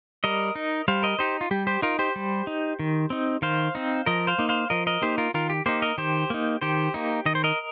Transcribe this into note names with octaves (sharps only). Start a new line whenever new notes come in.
G3 A#4 D#5
D#4
G3 C5 F5
A#4 D#5
D#4 G4 C5
F4
G3 G4
G4 C5
D#4 F4 A#4
G4 C5
G3
D#4
D#3
C4 D#4
D#3 C5 F5
C4 D#4
F3 A#4 D#5
C5 F5
A#3 D#4
C5 F5
F3 A#4 D#5
A#4 D#5
A#3 D#4 G4 C5
F4 A#4
D#3 F4 A#4
G4
A#3 D#4 G4 C5
A#4 D#5
D#3 G4 C5
A#3 D#4
D#3 G4 C5
A#3 D#4
D#3 D#5
C5
A#4 D#5